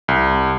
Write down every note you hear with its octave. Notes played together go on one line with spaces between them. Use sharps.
C2